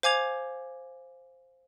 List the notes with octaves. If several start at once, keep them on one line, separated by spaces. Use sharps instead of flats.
C5 F5 G#5 D6 G#6 F7